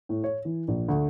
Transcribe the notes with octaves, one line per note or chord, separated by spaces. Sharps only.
A2
C#5
E3
A#1
D2